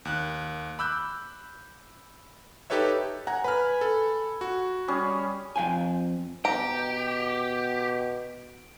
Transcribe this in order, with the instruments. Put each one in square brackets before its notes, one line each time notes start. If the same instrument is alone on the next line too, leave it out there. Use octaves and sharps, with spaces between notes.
[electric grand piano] D#2 F#6
B5 D6 E6 F#6 G6
D#4 G4 A4 B4 C#5 E5
[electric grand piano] F#5 A#5 [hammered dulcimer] G#5
[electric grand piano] B4 F6 [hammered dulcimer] B5
[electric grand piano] A4
F#4
[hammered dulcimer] G3 C#4 G#4
[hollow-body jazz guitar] F2 F5 G5 G#5
[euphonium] B2 [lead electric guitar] G4 [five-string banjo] A#5 [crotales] D7